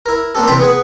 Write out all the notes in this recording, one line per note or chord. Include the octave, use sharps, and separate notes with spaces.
E4 A#4
A#3 C4 D4 G4 A4
C3 E3 G5 A5 B5 C6
B3 G#4 B4